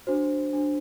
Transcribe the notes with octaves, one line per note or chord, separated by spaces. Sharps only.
D4 F#4 C5
D4 F#4 C5